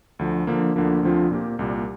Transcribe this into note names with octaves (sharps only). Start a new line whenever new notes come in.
D2 D3 F3
D3 F3 A#3
D2 D3 F3 A#3
D2 D3 F3 C4 F4
A#2 A#3 G4
C2 A#2 G3